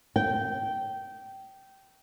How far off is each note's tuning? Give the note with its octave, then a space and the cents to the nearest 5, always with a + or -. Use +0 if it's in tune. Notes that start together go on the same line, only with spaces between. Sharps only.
G5 -15